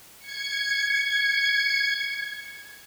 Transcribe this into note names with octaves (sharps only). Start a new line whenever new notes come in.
G#6 C#7